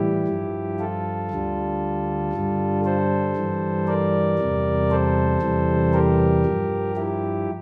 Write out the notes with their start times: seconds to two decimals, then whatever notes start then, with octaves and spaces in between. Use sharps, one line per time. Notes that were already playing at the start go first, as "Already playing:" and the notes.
Already playing: A2 E3 G3 E4 G4
0.28 G2 F3
0.79 F4 A4
1.31 D2 D3 G3
2.33 G2 D3 G3
2.84 A4 C5
3.36 G2 E3 G3
3.87 A#4 D5
4.39 E2 C3 G3
4.90 A4 C5
5.42 E2 C3 E3 G3
5.93 G4 A#4
6.46 G2 F3
6.96 E4 G4